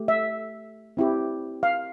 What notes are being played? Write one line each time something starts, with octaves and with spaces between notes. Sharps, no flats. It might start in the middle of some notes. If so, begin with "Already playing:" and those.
Already playing: A3 G4
E5
C4 E4 G4
F5